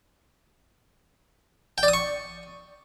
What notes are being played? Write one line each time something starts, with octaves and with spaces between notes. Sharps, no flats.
G5
D5
D#6
C#6